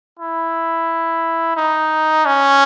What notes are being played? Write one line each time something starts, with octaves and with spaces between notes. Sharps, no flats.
E4
D#4
C#4